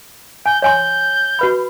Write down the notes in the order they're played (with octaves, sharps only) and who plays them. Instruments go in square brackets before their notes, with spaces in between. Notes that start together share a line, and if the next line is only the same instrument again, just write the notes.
[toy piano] G#5 [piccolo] G6
[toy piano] C#5 G#5 C6 [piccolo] G6
[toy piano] F#4 B4 B5